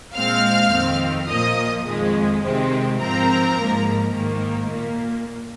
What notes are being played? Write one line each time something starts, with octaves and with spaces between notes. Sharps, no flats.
A#2 G#3 C4 F5 F6
F2 D#3 C4
A#2 F3 A#3 D#5 D#6
F2 D#3 G#3
C3 D#3 G#3 C4
G#2 F3 C4 A#4 A#5
G#2 F3 A#3
G#2 D#3 A#3
A#2 A#3